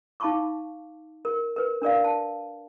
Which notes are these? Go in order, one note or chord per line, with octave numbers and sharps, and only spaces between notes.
D#4 F5 A5 B5 C#6 D6
A#4
A#4 B4
D4 A#4 D5 F5
A5